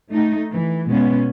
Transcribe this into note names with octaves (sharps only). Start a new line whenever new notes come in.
A3 D#4
E3
B2 G#3 B3 C#4